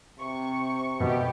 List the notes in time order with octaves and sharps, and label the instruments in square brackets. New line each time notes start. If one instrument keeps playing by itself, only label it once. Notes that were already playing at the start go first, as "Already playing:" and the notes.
[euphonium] C3 [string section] C#6
[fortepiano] B2 [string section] A3 B3 G4